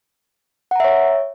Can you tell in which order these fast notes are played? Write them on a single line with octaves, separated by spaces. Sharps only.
F#5 A#5 E5 C#5